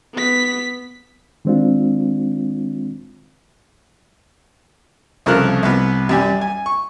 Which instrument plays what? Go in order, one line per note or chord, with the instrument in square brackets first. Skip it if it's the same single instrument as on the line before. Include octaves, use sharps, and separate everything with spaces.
[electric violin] B3 B6
[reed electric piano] D#3 G#3 C4 D4 F4
[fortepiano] C2 C#3 F3 A4 A#4 F#6
C2 B3
F#2 G3 G#5
G#5
C#6